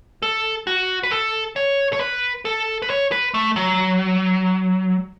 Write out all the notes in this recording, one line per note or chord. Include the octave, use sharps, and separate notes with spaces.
A4
F#4
B4
A4
C#5
C#5
B4
A4
B4
C#5
B4
A3
F#3